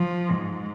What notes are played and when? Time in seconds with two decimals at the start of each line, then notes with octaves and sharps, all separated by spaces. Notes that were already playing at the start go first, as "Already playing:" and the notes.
Already playing: F3
0.30 G#2